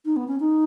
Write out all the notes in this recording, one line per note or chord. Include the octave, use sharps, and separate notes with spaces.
D#4
B3
C#4
D#4